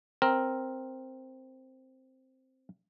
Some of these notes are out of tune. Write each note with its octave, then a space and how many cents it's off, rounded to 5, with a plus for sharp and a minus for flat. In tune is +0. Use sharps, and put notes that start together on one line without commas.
C4 +0 A#4 +0